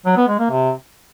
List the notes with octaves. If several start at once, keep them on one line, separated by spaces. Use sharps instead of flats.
F#3
B3
G#3
A#3
C3